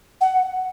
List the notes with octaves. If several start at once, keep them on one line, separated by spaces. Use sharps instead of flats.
F#5